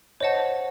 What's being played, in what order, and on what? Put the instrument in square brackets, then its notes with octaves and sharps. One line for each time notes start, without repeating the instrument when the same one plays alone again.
[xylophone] C5 D#5 F#5 A5 [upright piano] C#5